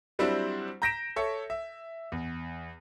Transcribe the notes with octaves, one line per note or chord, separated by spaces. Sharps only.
F#3 G3 C4 D4 E4 C5
A#5 G6 A#6 B6 D7 E7
A4 C#5 E5
E5
E2